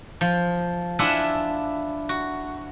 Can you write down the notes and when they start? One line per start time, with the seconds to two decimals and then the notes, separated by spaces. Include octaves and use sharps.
0.21 F3
0.99 D4 E4 F4 E5 F#5 G#5
2.09 F#4